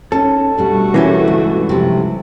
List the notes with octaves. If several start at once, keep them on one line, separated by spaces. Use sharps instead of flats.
C#4 D#4 A4
B2 G3 A3 D4 F#4
E3 A#3 C#4 G4
C#2 G2
C3 F3